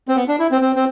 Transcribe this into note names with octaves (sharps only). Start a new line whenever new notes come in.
C4
B3
D4
E4
C4
C4
C4